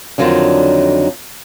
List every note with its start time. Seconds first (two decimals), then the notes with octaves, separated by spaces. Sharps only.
0.18 F2 D3 D#3 F#3 D4